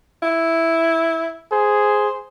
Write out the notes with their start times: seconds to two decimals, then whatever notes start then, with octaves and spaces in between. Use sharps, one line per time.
0.23 E4
1.52 G#4 C5